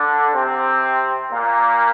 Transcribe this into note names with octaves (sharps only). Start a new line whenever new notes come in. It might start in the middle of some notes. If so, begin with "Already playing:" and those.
Already playing: D3 D4
C3 C4
A#2 A#3